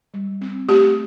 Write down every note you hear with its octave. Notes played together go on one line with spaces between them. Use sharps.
G3
C4
A3 G4